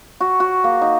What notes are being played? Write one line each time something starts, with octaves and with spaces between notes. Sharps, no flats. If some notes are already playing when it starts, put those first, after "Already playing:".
F#4
F#4
A#3
D#4